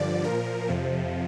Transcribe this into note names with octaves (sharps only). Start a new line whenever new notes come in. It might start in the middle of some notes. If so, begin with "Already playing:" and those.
Already playing: G2 D3 F3 D5
A#2 F3 A#4
F2 C3 F3